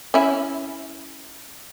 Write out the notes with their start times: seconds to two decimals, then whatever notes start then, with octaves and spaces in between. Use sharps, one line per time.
0.14 C#4 E4